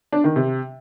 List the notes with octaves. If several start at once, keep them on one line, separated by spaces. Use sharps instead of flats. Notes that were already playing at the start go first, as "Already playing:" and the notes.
D4
D#3
C3